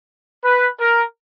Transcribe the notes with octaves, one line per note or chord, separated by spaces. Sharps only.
B4
A#4